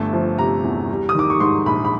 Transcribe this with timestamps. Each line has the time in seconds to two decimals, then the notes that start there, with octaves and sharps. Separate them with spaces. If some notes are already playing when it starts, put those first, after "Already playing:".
Already playing: G1 A3 A5
0.13 F3
0.38 C3 A#5
0.64 E2
0.89 G3
1.09 D#6
1.15 D#3 D6
1.30 C#6
1.40 G#2 C6
1.66 A#1 B5
1.85 B5